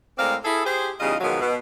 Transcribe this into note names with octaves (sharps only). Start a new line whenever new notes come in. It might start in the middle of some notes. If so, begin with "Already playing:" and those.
A2 G#3 C4 A#4 D5 F5
E4 G#4 A4
G4 G#4 C5
E2 C#3 G3 D#4 F4 D#5
G#2 B2 D#3 F3 F#3
B2